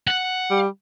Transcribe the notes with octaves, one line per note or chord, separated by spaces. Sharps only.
F#5
G3